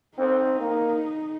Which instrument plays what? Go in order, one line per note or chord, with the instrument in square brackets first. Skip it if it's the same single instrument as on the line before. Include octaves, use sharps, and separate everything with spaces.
[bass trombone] C4 [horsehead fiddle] D#4
[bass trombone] A#3